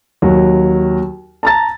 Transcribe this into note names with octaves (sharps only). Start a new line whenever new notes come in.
D#2 F#3
A5 A#5 A6